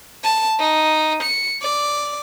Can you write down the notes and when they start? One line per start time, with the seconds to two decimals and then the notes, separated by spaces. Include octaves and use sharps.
0.24 A5
0.60 D#4
1.23 C#7
1.62 D5